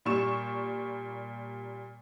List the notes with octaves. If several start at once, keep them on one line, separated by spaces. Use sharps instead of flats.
A#2 G3 C#6 E7